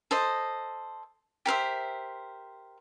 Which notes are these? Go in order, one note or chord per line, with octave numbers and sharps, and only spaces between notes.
A4 C5 D#5
G4 A#4 C5 E5